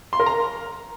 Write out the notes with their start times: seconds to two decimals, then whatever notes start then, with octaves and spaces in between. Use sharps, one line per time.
0.13 C6
0.20 A#4
0.26 A#5